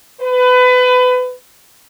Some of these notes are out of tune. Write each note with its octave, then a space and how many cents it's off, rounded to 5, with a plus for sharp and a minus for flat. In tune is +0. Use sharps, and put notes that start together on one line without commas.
B4 +25